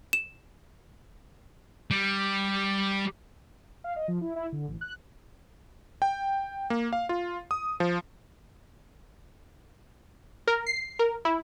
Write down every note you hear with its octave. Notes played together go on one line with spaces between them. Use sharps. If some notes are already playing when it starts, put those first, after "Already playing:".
E7
G3
F5
D#5
F3
E4
E4
D3
A1
F#6
G5
A#3
F5
F4
D#6
F3
A#4
C7
A#4
E4